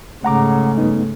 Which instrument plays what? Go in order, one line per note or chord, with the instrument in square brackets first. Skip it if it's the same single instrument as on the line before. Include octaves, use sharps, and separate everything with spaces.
[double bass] G#2 C#3 [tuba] A3 [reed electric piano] F#5 A#5 D6
[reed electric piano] G2 B3 D#4